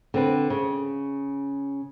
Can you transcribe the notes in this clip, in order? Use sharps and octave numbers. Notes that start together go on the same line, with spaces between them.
D3 C4 B4
C#3